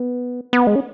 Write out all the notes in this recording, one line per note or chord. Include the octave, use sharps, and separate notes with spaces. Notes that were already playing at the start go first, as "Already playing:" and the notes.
Already playing: B3
B3
G#3
C#4